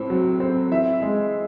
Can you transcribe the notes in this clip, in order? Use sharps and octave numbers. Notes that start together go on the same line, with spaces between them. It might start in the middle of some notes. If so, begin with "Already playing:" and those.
Already playing: A2 C4
F#3
C4
E3 E5
G#3